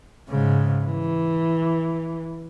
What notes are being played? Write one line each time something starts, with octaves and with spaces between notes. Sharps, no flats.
G#2 C#3
E3